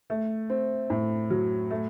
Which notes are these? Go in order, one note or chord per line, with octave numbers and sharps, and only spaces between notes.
A3
C4
A2
F#3
A3